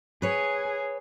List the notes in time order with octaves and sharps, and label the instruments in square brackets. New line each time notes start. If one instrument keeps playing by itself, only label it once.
[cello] G#4 [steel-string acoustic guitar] B4 C#5